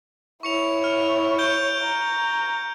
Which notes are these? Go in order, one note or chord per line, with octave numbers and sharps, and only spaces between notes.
E4 C#5 C#6 C#7 F7
F6
G6 D7 G7
A#5